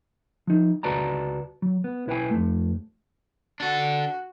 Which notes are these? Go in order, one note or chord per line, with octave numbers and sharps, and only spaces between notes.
F3 D#4
C#2 F#4 B4 D5 A5 A#5
F#3
B3
B1 E4 B4 F5 G5 G#5
F2 A3
D4 F#4 A4